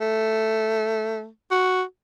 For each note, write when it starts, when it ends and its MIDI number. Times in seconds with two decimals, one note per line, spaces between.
0.01 1.29 57
1.51 1.82 66